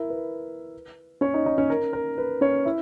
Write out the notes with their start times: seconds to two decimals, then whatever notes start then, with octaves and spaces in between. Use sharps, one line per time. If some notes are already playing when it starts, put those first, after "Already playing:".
Already playing: E4 A#4 E5
0.10 B4
1.21 C#4 C#5
1.34 D#4 D#5
1.46 D#4 D#5
1.58 C#4 C#5
1.70 A#4
1.93 A#4
2.18 B4
2.41 C#4 C#5
2.65 E4 E5